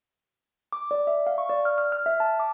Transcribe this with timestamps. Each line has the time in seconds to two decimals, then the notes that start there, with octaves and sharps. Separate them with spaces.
0.73 D6
0.91 D5
1.07 E5
1.27 F5
1.38 C#6
1.50 D5
1.65 F6
1.78 F6
1.92 F6
2.06 E5
2.20 A5
2.40 D6